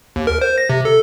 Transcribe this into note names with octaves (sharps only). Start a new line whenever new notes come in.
D#2
A#4
C5
A#6
C3
A4